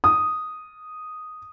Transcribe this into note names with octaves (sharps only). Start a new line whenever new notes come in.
D#6